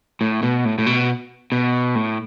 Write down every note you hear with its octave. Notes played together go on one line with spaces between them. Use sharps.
A2
B2
A2
A2
B2
B2
A2